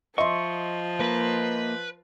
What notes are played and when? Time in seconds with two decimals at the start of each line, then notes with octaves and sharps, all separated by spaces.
0.18 F3 D#5 E5 C6 C#6
1.00 A#3 B4